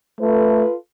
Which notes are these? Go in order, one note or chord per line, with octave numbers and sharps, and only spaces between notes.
A3 F4 A4 B4